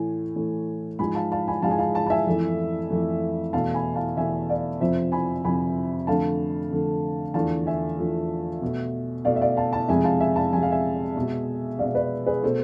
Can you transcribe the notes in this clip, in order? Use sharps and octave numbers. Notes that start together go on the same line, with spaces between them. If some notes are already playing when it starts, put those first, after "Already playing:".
Already playing: A2 E3 A3 G#5
A2 E3 A3
G#2 F3 G#3 G#5 B5
F5 A5
F5 A5
G#5 B5
G#2 F3 G#3 F5 A5
G#5
F5 A5
F5 A5
A5
E5 G#5
F2 E3 A3
F2 E3 A3
E2 B2 A3 F5 A5
G#5 B5
F5 A5
E2 B2 A3 E5 G#5
D5 F5
F2 C3 F3 C5 E5
G#5 B5
F2 C3 F3 G#5 B5
F2 D3 A3 F5 A5
F2 D3 A3
E2 D3 F3 A3 F5 A5
E5 G#5
E2 D3 F3 A3
B2 A3
B2 A3 D5 F5
E5
D5 F5
F5 A5
F5 A5
F2 C3 G#3 E5 G#5
F5 A5
E5 G#5
F5 A5
F2 C3 G#3 G#5
F5
E5 G#5
B2 G#3
B2 G#3 D5 F5
B4 D5
G#4 B4
B2 A3 A4 C5